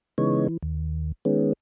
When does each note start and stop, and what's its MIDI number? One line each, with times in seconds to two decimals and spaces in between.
0.18 0.47 49
0.18 0.47 52
0.18 0.47 56
0.18 0.47 59
0.18 0.47 63
0.18 0.47 73
0.48 0.57 52
0.62 1.12 39
1.25 1.53 51
1.25 1.53 56
1.25 1.53 59
1.25 1.53 61